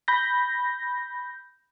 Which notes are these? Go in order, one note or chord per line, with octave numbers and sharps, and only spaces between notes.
B5 G6 A#6